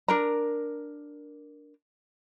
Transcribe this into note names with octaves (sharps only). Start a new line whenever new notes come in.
D4 A#4 A#5